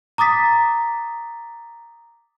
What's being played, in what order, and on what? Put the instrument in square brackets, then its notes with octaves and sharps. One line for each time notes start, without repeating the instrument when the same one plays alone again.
[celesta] A#5 D6 D#6 A6 B6